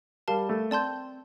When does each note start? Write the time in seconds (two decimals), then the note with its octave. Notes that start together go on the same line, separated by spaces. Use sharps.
0.28 G3 A#4 F5 A5
0.49 A3
0.71 C4 D5 A5 C6 G6